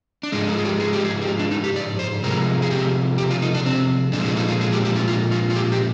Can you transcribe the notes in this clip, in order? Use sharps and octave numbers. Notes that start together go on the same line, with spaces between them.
D4
G#2 F3 G#3 D#4
F4
G#4
G4
G#4
G4
G#4
G4
F4
D4
D#4
G4
D5
C5
C3 F3 G#3 A#4
G#4
G4
G4
F4
D#4
D4
C4
A#2 F3 G#3 D4
D4
D#4
F4
G#4
G4
G4
F4
F4
F4
F4
G4
G4